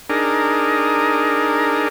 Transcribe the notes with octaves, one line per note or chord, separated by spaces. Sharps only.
D4 D#4 G#4 A#4